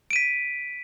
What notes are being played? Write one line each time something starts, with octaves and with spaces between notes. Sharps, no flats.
B6 D7 D#7